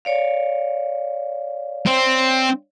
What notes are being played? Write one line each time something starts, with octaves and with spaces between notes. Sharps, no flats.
C#5 D5 F5
C4